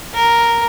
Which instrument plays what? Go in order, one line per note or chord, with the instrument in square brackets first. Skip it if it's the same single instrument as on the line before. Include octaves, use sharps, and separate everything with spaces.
[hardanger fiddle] A#4